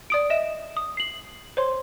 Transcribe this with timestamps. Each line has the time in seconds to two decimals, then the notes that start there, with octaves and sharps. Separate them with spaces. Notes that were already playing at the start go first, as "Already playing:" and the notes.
0.10 D5 D#6 D7
0.30 D#5 E5 E7
0.77 D#6
0.97 C7 F#7
1.57 C5 C#5 C6